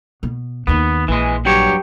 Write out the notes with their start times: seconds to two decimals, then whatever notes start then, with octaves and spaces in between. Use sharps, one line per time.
0.23 B2
0.67 D#2 D#3 B3
1.08 A#1 E3 G#3
1.45 G2 F#3 G4 C#5